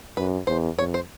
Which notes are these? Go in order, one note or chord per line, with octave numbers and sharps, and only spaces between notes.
F#2 B4
E2 C5
F2 C#5
C5